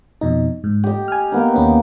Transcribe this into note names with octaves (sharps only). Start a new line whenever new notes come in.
F2 B2 D#4
G#2
G4 D#5
G#5 F6
A#3 B3 D#4
D#2 C#4 B4